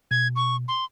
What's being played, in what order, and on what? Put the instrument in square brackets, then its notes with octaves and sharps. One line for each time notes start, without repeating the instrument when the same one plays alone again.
[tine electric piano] B2 [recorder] G#6
[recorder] C#6
C6